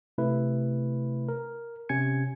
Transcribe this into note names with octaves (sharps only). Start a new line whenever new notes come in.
C3 A3 E4 B4
A#4
C3 C#4 G#5 G#6 C#7